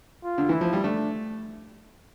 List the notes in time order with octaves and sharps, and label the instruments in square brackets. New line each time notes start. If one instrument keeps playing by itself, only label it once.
[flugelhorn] F4
[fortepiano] D3
[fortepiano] E3 [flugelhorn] E4
[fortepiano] F3
G3
[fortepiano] A3 [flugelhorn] D4